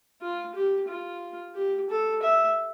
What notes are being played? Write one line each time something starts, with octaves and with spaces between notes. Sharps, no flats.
F4
G4
F4
G4
A4
E5